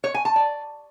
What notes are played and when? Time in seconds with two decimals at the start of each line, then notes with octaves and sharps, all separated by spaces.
0.04 C#5
0.14 G#5
0.25 A5
0.36 D5